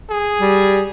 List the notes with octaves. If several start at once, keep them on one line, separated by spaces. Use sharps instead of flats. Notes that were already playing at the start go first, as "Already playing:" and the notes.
G#4
G3